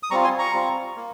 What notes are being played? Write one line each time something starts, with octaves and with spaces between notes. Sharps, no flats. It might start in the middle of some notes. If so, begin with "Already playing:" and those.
D#6
G3 C4 F4 A#5 C#6
G#5 C6
A#5 C#6
G3 C4 F4
A#3